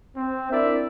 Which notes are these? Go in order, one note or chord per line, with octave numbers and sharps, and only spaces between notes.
C4
D4 E4 A#4 D5 E5